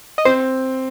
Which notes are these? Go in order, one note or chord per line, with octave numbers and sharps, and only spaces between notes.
D#5
C4 C5